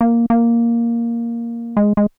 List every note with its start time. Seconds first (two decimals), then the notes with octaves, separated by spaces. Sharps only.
0.01 A#3
0.30 A#3
1.77 G#3
1.97 G#3